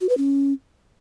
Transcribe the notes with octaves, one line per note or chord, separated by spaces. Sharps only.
F#4
B4
C#4